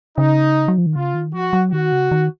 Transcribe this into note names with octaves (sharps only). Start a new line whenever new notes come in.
C#3 D#4
F#3
F3
D#3
C#3 F4
D#3
F3 F#4
F#3
D#3 F#4
C#3
D#3